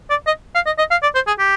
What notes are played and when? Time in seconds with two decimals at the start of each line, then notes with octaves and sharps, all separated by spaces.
0.10 D5
0.27 D#5
0.55 F5
0.66 D#5
0.78 D#5
0.91 F5
1.02 D5
1.15 C5
1.27 G#4
1.39 G4